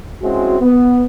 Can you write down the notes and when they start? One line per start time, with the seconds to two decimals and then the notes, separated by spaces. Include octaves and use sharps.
0.22 G#3 C4 C#4 E4 F#4
0.60 B3